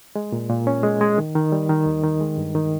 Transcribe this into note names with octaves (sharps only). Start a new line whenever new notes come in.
G#3
A#2
A#2
C#4
G#3
G#3
D#3
D#3
G3
D#3
D#2
D#3
G#3
G2
D#3